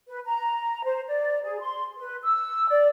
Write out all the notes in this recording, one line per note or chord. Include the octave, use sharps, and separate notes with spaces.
B4
A#5
C5
D5
G#4
C6
B4
E6
D5